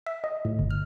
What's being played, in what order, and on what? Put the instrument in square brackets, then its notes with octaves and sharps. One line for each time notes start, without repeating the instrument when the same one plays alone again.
[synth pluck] E5
D#5
A2
G1
F6